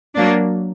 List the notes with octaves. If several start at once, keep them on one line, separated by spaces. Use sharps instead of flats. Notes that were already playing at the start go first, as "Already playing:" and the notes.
F#3 A#3 D4